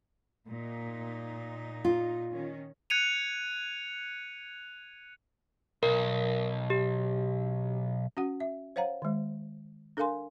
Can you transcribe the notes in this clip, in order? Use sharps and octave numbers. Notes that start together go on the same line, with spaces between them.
A#2 D#4
F4
D#3 C#4
F#6 G#6 C#7 D#7 F7
B1 A#4
G4
C#4 F#4 F#5
E5
C5 C#5 F5 F#5 A#5
D#3 G#3
D4 A4 A#4 F5 G#5 C6